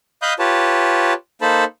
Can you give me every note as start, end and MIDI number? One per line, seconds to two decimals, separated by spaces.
0.22 0.33 75
0.22 0.33 77
0.22 0.33 83
0.22 0.33 87
0.22 0.33 90
0.22 0.33 91
0.39 1.13 65
0.39 1.13 67
0.39 1.13 71
0.39 1.13 73
0.39 1.13 81
1.41 1.64 58
1.41 1.64 63
1.41 1.64 69
1.41 1.64 72
1.41 1.64 81
1.41 1.64 83